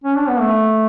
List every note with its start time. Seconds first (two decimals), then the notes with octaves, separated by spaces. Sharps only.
0.04 C#4
0.16 D4
0.28 B3
0.40 A3